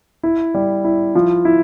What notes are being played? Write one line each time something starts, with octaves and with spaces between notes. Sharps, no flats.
E4
G3
E4
F3
E4